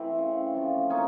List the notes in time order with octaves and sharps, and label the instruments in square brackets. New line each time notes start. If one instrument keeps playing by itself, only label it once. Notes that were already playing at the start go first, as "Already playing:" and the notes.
Already playing: [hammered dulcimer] E3 A3 C4
C#3
F3 A3
A#2 C#4 D#4